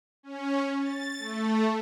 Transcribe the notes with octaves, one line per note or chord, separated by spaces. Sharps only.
C#4
A6
A3